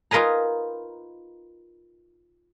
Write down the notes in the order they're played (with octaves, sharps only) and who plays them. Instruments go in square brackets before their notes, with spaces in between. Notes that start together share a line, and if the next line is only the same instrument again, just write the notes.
[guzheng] D#4 F4 A#4 B4 G#5 A#5